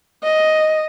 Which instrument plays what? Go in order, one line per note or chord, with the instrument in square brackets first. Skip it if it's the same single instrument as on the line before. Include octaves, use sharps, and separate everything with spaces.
[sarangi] D#5